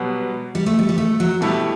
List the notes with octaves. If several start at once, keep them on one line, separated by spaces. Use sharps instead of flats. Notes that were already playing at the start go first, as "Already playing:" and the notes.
Already playing: B2 F#3 G3 B3
G3
A3
G3
G3
A3
F#3
B2 G3 A3 E4 G4